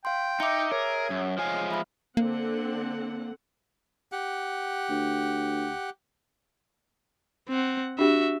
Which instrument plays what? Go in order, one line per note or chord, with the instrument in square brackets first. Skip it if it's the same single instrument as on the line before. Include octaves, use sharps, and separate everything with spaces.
[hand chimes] F5 C6 [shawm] G5
[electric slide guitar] D#4 [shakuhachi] E5 [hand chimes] D6 C#7
[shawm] G#4 [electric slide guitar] A#4 [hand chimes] C#5
[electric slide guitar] F#2
[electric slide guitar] F3 G#3 G#5 [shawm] F5
[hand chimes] E5 F5 F6 [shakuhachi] B5
[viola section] D3 C4 F#5 [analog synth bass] A#3
[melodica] G4 F#5
[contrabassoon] D2
[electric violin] C4 F#5
[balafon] D4 G4 [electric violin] F#4 E5